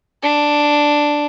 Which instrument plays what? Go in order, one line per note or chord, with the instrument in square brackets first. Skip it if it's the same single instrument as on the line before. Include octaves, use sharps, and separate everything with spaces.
[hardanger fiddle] D4